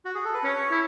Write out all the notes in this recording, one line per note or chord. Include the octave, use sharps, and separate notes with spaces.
F#4
G#4
A4
B4
C#4 C#5
E4